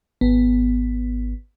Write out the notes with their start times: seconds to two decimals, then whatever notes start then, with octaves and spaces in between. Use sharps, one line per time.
0.21 G#1 B3